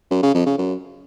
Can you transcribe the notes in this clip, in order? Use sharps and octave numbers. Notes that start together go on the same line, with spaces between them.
F#2
C#3
F2
C#3
F#2